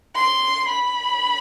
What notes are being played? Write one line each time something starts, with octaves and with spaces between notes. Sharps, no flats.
C6
B5